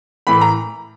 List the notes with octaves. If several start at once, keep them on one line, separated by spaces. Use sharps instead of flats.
A2 E3 B5
A#5